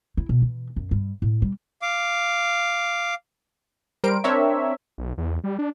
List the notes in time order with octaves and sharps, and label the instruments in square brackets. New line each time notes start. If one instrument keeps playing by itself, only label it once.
[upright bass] E4
B2
E3
F#2
G2
A2
G3
[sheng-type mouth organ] F5 D6
[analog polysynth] G3 A#4 C5 D7
C4 D4 A#4 C#5 E5
[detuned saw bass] B1
E2
G3
D4